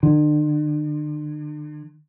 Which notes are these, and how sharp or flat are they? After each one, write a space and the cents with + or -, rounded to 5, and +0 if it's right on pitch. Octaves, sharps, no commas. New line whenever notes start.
D3 +40